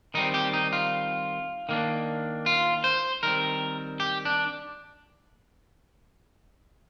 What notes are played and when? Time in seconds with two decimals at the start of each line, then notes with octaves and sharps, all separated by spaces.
0.14 D#3 G3 C4 D#4
0.34 G4
0.53 D#4
0.73 F4
1.69 D#3 A#3 D4
2.46 F4
2.84 C5
3.23 D#3 G3 C4 A#4
4.00 G4
4.25 D4